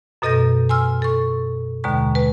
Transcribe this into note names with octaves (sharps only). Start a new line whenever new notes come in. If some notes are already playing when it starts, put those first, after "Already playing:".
F#2 B2 A4 D#5 G6 A#6
G#5 C6 E6 F6
A4 C#6
D#2 B2 D3 G#3 A#5 C#6
G#3 B4